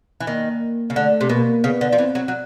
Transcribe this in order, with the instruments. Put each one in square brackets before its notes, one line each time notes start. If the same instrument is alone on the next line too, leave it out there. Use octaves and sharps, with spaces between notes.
[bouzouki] E3
[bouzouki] D#3 [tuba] A#3
[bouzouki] C#3
[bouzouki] D3 [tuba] A3
[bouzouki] C3
[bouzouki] B2 [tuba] A#3
[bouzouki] C#3 [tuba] B3
[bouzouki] D3
F3
[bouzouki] E3 [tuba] C4
[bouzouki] F#3
F#3